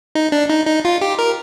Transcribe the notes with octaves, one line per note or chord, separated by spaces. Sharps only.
D#4
D4
D#4
D#4
F4
G4
A#4